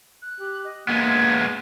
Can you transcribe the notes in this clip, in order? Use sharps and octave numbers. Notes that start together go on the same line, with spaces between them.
F#6
G4
D#5
G#3 A#3 B3 G#6